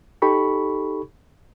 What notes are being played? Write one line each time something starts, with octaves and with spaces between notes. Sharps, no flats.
D#4 G4 A4 B5 C#6